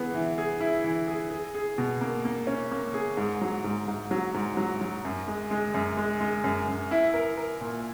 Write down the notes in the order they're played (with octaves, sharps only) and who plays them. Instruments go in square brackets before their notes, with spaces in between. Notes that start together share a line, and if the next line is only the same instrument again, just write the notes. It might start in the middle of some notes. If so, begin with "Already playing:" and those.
Already playing: [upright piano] E3 B3 G#4
E3
G#4
E4
E3
G#4
G#4
G#4
B2
A#3
A#3
C#4
A#3
G#4
G#2
F#3
G#2
G#2
F#3
G#2
F#3
F#3
F#2
G#3
G#3
F#2
G#3
G#3
F#2
F#2
E4
A#4
A#4
A#2